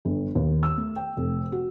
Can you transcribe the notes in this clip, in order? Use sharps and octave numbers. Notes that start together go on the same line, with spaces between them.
G1
D#2
E6
A3
G5
F1
F#4